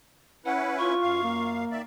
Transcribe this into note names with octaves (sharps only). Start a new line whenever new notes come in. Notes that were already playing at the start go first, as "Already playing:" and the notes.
C#4 E4 B4 F#5
F4 C#6
F#2 F5
A#3
D#3 D5 E5